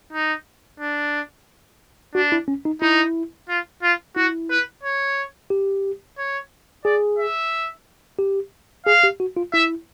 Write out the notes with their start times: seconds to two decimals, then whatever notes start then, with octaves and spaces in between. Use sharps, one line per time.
0.13 D#4
0.80 D4
2.15 D4 F#4
2.32 E4
2.48 C#4
2.65 D#4
2.81 D#4 E4
3.49 F4
3.82 F4
4.16 E4 F#4
4.50 B4
4.83 C#5
5.50 G4
6.18 C#5
6.85 G#4 D5
7.19 E5
8.19 G4
8.86 G#4 F5
9.03 G4
9.20 F#4
9.37 F4
9.53 E4 E5